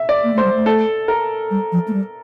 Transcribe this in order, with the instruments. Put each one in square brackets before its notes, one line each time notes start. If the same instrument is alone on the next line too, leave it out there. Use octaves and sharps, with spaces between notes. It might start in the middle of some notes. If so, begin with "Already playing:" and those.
Already playing: [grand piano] E5
D5
[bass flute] A#3
[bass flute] A3 [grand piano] C5
[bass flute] G3
A3
[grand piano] A4
A#4
[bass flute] G3
F3
A3
G3